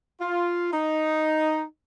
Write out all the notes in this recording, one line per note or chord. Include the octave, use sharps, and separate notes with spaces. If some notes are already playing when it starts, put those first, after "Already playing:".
F4
D#4